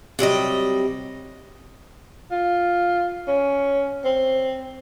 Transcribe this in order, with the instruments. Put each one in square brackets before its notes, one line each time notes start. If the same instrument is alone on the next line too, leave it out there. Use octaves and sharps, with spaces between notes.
[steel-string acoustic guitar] C3 F#3 G3 D#5
[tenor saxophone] F4
C#4
C4